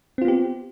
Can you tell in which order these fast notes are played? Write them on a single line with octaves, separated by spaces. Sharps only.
C4 F4 B3 G4